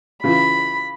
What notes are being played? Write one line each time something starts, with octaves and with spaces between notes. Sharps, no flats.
C#3 E3 F4 B5